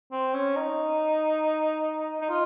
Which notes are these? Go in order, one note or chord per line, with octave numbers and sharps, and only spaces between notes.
C4
C#4
D#4
D#4
F4